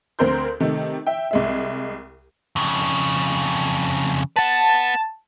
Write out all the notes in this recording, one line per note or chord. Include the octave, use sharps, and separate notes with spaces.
D2 C4 A#4 C6 G6
C3 D#3 A3
E5 G5
C2 G#3 E5
F2 C#3
B4 F#5 A5